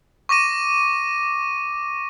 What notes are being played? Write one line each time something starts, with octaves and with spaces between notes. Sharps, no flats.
C#6 D6 A#6 D#7